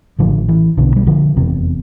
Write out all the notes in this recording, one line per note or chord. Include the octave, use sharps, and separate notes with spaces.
A1 A2 D3 F3
E3
B1 B2 D3
G3
D3 F3
F1 E2 C3